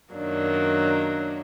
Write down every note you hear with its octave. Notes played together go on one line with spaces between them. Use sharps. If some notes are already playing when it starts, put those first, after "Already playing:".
F#2 D#3 F#3 A#3 D4